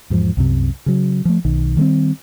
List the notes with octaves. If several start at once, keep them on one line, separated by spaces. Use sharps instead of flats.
E2 G#2 F3
C2 F#2 C3
C#3 F#3
F3 A3
B1 D#3
D#3 G3 G#3 C4